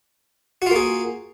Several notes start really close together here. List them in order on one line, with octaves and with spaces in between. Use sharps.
F#4 F4 A#3 G#4